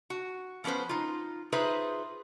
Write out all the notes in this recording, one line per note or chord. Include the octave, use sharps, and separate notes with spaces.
F#4
F3 B3 C#4 B4 C5
D#4 F4
D#4 F4 G#4 B4 C5 E5